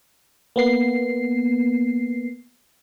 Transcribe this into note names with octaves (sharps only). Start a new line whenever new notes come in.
A#3 B3 C7